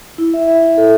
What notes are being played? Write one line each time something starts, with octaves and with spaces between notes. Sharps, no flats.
E4
E5
E5
E4
A4